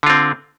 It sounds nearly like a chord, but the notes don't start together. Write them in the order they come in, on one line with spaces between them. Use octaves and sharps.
D3 F4 C4